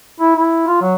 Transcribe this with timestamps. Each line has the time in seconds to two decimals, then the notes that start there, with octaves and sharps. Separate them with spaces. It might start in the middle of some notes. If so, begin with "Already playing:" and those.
0.20 E4
0.36 E4
0.67 F4
0.81 F#3